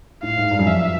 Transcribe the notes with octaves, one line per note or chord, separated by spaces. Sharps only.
A2 F5
G#2
G2
F#2
F2 E5